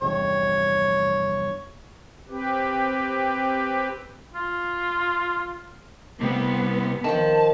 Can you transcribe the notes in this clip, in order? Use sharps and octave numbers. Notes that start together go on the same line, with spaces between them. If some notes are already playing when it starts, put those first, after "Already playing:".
F1 E2 G2 C#5
C4 G4 B4
F4
C3 G3 B3
D#3 F3 A5